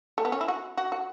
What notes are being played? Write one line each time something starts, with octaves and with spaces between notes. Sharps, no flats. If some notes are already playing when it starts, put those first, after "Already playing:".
A3
B3
C#4
E4
F#4
F#4
F#4